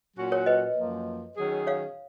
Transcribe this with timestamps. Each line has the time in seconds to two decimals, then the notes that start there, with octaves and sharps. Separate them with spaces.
0.17 A#2 F#3 C#4 F#4
0.32 A#4 C#5
0.46 B4 D#5
0.76 F#2 F3 A#3
1.37 D#3 F#3 C#4 G#4
1.67 C#5 F5